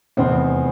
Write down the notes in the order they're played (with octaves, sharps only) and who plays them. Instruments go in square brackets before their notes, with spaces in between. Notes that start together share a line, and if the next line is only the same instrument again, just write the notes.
[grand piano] F1 E2 E3 C4